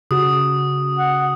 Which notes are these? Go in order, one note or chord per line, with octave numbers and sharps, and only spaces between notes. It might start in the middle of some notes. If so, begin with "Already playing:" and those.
C#3 F#4 D#6
F#5